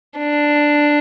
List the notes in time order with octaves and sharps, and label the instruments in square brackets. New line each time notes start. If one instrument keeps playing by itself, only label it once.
[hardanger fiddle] D4